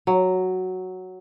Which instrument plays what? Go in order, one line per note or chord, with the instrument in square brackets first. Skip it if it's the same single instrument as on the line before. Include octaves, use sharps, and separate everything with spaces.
[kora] F#3